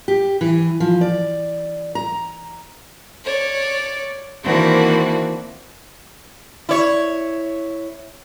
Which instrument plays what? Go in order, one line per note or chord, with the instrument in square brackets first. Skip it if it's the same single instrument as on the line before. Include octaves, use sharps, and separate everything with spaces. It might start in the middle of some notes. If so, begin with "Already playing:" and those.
[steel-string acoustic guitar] G4
E3
F3
D5
A#5
[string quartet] C#5 D5
D#3 E3 A#3 C4 D4 F#4
[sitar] E4 C#5